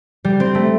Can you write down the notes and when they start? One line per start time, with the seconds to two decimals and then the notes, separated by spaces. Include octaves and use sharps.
0.25 G3
0.40 C4
0.55 A3